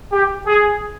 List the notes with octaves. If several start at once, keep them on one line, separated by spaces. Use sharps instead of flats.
G4
G#4